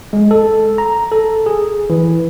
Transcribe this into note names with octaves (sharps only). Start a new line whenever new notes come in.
G#3
A4
A#5
A4
G#4
E3